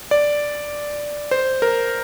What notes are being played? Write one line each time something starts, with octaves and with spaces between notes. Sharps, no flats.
D5
C5
A#4